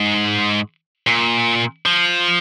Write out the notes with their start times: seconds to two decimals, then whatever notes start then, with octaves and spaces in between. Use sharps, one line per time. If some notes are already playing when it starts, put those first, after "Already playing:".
Already playing: G#2
1.07 A#2
1.86 F3